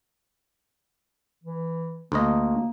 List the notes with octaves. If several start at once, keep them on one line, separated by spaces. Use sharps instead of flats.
E3
D2 A#3 D#5